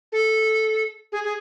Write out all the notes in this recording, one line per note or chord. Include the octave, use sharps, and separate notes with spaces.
A4
G#4
G#4